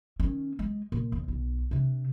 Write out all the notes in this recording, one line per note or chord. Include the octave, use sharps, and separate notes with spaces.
D#3 C#4
G#3
A#2
E2
B1
C3 D4